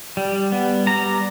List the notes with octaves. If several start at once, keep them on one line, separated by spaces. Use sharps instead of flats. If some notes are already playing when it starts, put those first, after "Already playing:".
G3
B3
G3 A#5